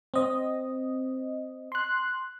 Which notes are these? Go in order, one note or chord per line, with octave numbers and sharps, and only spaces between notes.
C4 D#5
C6 F#6